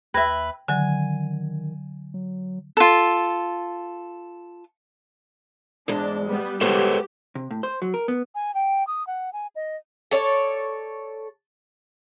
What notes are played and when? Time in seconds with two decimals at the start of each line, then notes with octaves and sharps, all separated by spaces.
0.14 D#2 B4 E5 G5 G#6 A#6
0.68 D3 D#3 F#3 G#5
2.14 F#3
2.77 F4 A4
5.88 E2 G#2 G#3 D4
6.25 G3 B3
6.61 G#3 B3 G4 A4 C5 C#5
7.35 C3
7.51 A2
7.63 C5
7.82 F#3
7.94 A#4
8.08 B3
8.35 G#5
8.54 G5
8.87 D#6
9.07 F#5
9.33 G#5
9.55 D#5
10.11 A4 C#5 D5